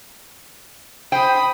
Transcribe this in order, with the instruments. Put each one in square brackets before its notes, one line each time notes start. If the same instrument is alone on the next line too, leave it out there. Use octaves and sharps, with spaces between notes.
[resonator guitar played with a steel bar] C5 G5 [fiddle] B5 D#6